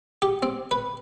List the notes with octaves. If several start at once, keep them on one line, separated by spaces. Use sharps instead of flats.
G4
C4
B4